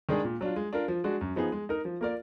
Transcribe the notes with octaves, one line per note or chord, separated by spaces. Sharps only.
D#3 G#3 D4 G#4
A#2
F#3 D4 F4
G#3
D4 F4 A#4
F3
G#3 D4 F#4
F#2
F3 B3 D#4 G#4
G#3
D#4 A#4
F3
A#3 F4 A#4 D5